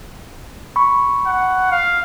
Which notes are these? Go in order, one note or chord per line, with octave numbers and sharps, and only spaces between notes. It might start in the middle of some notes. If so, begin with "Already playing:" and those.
B5 C#6
F#5
F5